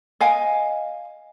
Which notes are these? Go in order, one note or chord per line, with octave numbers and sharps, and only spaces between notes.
D#5 F5 G#5